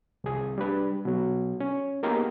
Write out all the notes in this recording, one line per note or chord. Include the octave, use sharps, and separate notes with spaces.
C2 G#4
G3 D4 B4
B2 F#3
C#4
A#3 B3 D#4 G4 G#4 A#4